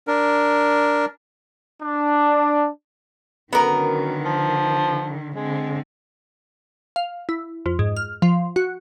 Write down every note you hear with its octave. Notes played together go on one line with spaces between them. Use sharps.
D4 A#4
D4
F#2 D3 D#3 B3 A#4
F3
D3 G#3 C4
F5
E4
F2
G#2
F6
F3
F#4